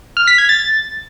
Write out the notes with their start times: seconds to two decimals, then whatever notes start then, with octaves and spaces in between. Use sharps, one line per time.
0.17 F6
0.27 B6
0.38 G#6
0.49 A6